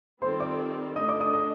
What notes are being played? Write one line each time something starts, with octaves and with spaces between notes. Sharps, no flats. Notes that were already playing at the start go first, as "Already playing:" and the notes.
D#3 G3 C4 F4 A4 C5 C6
D5 D6
D3 A3 D4 D#5 D#6
D5 D6
D#5 D#6
D#5 D#6